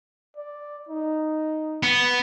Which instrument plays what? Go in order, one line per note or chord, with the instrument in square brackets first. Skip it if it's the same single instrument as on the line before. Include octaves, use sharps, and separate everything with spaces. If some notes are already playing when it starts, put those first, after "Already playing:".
[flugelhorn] D5
D#4
[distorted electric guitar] B3